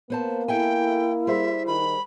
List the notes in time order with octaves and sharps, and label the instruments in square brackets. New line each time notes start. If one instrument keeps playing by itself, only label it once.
[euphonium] A#3 [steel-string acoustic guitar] B3 C5 A5
[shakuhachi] E4 [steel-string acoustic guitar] A4 E5 G#5 [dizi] G5
[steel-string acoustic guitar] G3 G#4 C5 [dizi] E5
[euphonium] D#3 [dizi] B5